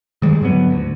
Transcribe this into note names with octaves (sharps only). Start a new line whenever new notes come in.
D#3 G3 G#3
G#2 D3 F#3 B3
D2